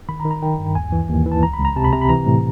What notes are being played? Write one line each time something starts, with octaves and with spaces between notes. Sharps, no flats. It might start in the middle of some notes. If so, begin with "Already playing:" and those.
D#3 B5
A#5
D#3
A#5
D#3 G5
G2
D#2 G#5
E3
D#2
E3
A5
C#2 A#5
B5
C#2
A#5
C3 A5
B5
C3 A#5
B5
E3 A#5
A2